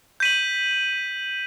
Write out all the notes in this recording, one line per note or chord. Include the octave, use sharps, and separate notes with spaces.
G6 B6 D#7 F#7